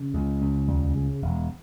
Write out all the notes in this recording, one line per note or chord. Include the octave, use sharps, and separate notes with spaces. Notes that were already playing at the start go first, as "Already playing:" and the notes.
Already playing: C#3
C#2
C#2
D#2 G3
C#3
E1